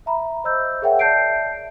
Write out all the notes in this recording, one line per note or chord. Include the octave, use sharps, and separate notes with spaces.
E5 A#5 B5
C5 D#5 E6 G6
G#4 A#4 C#5 E5 F#5 G5
D5 E5 A5 G6 C7 D7